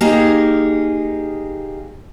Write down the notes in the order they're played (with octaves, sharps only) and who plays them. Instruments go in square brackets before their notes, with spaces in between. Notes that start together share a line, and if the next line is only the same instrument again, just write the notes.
[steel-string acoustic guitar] A#3 D#4 G4 G#4